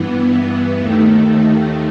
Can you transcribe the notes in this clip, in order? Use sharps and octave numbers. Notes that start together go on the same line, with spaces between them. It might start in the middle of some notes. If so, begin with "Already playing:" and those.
Already playing: G2 E3 B3
D#2 D#3 A3